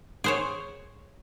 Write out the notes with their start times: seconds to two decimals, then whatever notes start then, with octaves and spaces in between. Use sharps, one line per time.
0.24 G#4 C5 C#5